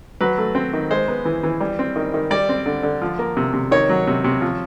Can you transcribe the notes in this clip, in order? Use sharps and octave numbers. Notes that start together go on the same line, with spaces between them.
F#3 B4
A3
C4
D#3
G#3 C5
B3
E3
E3
G3
C4
D#3
D#3
G3 D5
C4
D3
D3
F3
A#3
C3
C3
D#3 C#5
F#3
C3
C3
F3